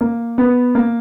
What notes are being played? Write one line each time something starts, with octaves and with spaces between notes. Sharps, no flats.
A#3
B3
A#3